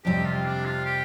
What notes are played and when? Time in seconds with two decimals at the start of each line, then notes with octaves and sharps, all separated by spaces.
0.04 F2 C3 G3 G4
0.25 F4
0.45 D4
0.66 F4
0.85 G4